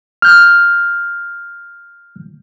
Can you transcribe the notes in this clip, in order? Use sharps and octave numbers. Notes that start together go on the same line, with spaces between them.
F6 G6